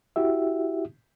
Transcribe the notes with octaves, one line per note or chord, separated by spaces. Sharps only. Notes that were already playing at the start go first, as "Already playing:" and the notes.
E4 F#4 G4 E5